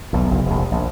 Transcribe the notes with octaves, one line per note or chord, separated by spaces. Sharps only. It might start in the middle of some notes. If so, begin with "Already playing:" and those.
B1 E2
F#1 B1
F1 A#1
A#1